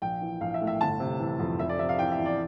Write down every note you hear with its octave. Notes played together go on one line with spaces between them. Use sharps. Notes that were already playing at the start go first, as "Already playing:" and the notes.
A#1 G5
E3
A#1 F5
E5
A2
E5
G1 A5
C3
E3
F2
F1 E5
D5
C3 E5
F5
E3 G5
E5
E2
D5